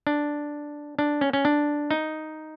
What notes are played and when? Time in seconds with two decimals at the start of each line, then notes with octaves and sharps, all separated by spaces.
0.07 D4
0.99 D4
1.21 C#4
1.33 C#4
1.45 D4
1.91 D#4